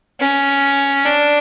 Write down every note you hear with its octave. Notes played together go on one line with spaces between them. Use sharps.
C#4
D4